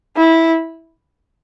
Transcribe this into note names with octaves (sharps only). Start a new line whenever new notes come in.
E4